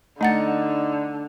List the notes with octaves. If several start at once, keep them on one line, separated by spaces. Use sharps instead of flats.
D3 A3 D#4 F#5 A6 C#7